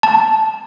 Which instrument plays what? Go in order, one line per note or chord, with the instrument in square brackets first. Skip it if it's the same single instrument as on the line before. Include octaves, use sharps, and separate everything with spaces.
[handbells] A5